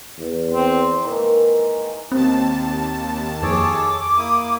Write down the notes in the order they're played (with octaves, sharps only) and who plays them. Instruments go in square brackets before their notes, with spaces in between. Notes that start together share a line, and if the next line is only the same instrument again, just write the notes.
[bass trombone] E2
[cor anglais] C4
[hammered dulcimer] D#3 E3 G#3 A#3
[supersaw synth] D#2 A5 [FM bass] C4
[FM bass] F2 [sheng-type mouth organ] G#4 A4 C#5 [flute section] D6
[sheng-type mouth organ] A#3 E4 D#6